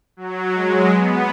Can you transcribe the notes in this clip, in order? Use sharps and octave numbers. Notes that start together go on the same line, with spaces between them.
F#3
G#3
B3